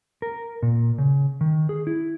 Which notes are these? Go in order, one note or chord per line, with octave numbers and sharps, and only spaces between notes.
A#4
A#2
C#3
D#3
G#4
E4